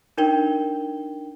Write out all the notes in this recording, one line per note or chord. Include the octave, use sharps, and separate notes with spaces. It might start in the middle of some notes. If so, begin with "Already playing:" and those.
D4 D#4 A#4 G5 G7